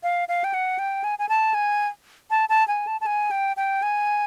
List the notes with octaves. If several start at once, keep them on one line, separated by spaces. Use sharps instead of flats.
F5
F5
G5
F#5
G5
G#5
G#5
A5
G#5
A5
A5
G#5
A5
A5
G#5
G5
G5
G#5